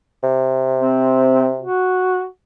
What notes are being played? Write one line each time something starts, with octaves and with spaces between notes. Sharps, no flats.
C3
C4
F#4